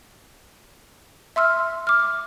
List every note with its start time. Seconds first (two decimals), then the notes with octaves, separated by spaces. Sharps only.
1.36 E5 C6 E6 F6
1.87 D6 F6